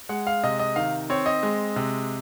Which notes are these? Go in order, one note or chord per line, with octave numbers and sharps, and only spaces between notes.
G#3 F#5
F5
C3 D#5
D#5
D#3 F5
C4 C#5
D#5
G#3
C3